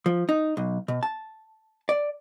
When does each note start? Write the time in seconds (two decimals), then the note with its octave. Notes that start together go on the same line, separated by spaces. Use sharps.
0.06 F3
0.29 D#4
0.57 B1
0.88 B2
1.03 A5
1.89 D5